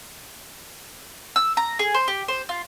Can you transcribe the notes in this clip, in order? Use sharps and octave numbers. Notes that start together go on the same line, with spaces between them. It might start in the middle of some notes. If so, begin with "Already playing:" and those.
E6
A#5
G#4
C5
G4
C5
F4